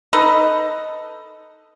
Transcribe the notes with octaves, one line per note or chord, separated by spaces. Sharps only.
D#4 A4 B4 D#5